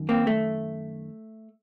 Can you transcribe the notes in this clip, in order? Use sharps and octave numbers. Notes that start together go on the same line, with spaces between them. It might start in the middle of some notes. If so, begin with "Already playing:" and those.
Already playing: F#2 D#3
A#3 C4
A3